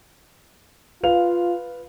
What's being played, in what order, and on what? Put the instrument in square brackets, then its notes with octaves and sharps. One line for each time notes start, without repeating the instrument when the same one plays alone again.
[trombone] F4 [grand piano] B4 F5 F7